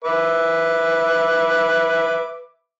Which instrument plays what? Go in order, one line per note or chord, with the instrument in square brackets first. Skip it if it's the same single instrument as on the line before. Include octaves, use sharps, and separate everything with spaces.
[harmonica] B4 E5 D6